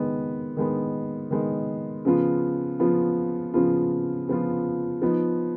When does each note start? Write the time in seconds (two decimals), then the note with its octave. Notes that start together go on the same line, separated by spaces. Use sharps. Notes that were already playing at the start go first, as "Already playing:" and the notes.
Already playing: D#3 G#3 B3
0.57 D#3 G#3 B3
1.31 D#3 G#3 B3
2.05 C#3 F3 B3 F4
2.79 C#3 F3 B3 F4
3.54 C#3 F3 B3 F4
4.28 C#3 F3 B3 F4
5.01 F3 B3 D#4